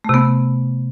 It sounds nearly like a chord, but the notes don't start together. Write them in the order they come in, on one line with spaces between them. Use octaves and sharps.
A3 C3 B3